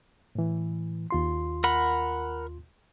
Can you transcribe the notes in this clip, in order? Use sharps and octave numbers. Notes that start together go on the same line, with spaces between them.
A2 E3
D#2 F4 C6
A#4 F#5 B5